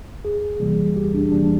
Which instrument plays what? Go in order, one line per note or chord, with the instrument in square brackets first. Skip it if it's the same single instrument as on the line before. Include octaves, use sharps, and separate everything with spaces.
[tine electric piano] E2 G#4
C3 E3 G3 A#3
E2 G4
D4
C3 E3 G3 A#3 D4